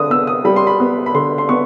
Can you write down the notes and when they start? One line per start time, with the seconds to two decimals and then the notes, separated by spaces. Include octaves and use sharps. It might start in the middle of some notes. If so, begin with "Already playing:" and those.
Already playing: D3 D#6
0.10 B3 E6
0.27 D#6
0.45 G3 B5
0.56 C6
0.67 B5
0.80 B3
1.06 B5
1.14 D3 C6
1.38 C6
1.49 B3 C#6